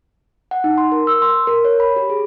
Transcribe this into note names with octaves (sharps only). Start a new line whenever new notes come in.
F#5
D#4
C6
A#4
E6
C6
A#4
C#5
B5
G4
G#4